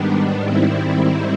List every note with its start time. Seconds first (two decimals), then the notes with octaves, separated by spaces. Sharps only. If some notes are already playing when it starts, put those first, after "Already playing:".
Already playing: G#2 D#3 G3 B3 D4
0.42 G#2 D#3 G3 C4 E4